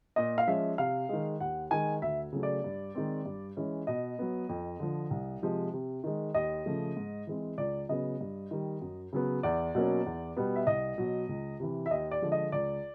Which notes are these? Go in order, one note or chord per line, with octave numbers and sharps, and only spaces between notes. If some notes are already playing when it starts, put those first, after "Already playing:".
A#2 D#5
F5
F3 G#3 C#4 E5
C3 F5
D#3 G#3
D#2 F#5
D#3 G#3 G#5
D2 E5
C#3 F#3 A3
D5
G2
D#3 G#3 C4
G2
E3 G#3 C#4
B2 D#5
F#3 B3
F2
D3 F3
C2
C3 F3 G#3
C3
D#3 G#3
D#2 D#5
C#3 F3 A3
G#2
E3 G#3 C4
C#2 D5
C#3 F#3 B3 D#5
G2
D#3 G3
F#2
C#3 F#3 B3
E2 D5
B2 F#3 A#3 C#4
E2
B2 G3 B3
E5
C2 D#5
B2 F#3
C#2
C3 E3
E5
D#2 D#5
D5
D3 F3 G#3
D#5
C#2 D5